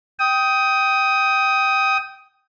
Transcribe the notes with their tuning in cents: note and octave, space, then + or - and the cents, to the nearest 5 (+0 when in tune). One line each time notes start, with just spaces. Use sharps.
G5 -10 D#6 +15